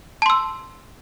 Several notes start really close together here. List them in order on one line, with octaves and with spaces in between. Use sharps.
A5 C6 E6